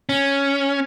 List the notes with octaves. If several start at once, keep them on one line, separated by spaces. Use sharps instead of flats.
C#4